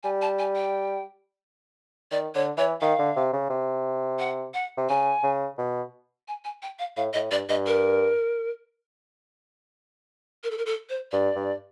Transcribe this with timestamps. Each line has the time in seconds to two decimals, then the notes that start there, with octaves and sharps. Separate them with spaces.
0.03 G3 G#5
0.22 A5
0.39 G#5
0.56 G5
2.11 D#3 D5
2.35 D3 C#5
2.57 E3 C#5
2.81 D#3 F5
2.99 D3
3.16 C3
3.33 C#3
3.50 C3
4.19 F#5
4.54 F#5
4.77 C3
4.89 C#3 G#5
5.23 C#3
5.58 B2
6.28 G#5
6.45 G#5
6.62 G5
6.79 F5
6.97 A2 F5
7.13 A2 D#5
7.31 G2 D5
7.49 G2 D#5
7.67 A#4
10.44 A#4
10.51 A4
10.58 A#4
10.66 A4
10.90 C5
11.12 G2 D5
11.35 G2